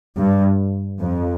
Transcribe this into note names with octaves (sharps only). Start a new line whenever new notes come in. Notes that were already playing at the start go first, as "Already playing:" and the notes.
G2
F2